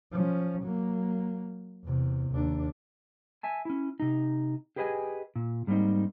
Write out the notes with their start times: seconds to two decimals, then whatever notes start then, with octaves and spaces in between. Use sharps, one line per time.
0.12 F3 C#4
0.62 F#3 A#3
1.84 E2 C3
2.30 D#2 D4
3.43 E5 G#5 A5
3.65 C#4 E4
4.00 C3 D#4
4.76 G4 G#4 B4 D#5 E5 G#5
5.35 A#2
5.67 G#2 G3 A#3 C4 D#4